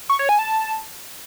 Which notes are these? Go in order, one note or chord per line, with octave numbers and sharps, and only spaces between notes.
C#6
C#5
G#5
A5